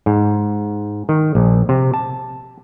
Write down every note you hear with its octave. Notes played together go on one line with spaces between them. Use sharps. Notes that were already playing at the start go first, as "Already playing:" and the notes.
G#2
D#3
A#1
C3
A5